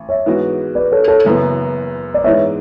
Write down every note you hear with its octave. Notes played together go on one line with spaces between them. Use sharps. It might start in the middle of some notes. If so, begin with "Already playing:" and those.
Already playing: A1
C#5 E5
G#2 E3 B3 F#4
B4 D5
A4 C#5
A4 C#5
F#1 F#2 E3 B3
D5
G#2 E3 B3 C#5 E5